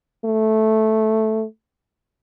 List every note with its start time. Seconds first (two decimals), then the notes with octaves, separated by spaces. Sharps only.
0.25 A3